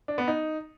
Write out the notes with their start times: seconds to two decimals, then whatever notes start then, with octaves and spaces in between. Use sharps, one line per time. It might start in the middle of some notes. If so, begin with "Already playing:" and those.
0.08 D4
0.18 B3
0.28 D#4